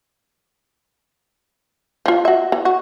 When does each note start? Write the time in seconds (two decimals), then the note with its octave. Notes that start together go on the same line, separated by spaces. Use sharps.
2.06 F3 F4
2.25 F#4 E5
2.52 E3
2.65 F#4